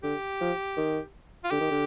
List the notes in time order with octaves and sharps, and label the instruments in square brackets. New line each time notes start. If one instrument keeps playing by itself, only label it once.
[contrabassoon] D3 [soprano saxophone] G4
[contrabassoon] F3
D#3
[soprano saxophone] F4
[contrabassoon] D3 [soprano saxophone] G4
[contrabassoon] D#3
D3